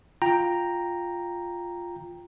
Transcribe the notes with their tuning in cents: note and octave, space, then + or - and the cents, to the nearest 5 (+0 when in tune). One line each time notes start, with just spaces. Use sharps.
F4 +0 G5 +5 A#5 +0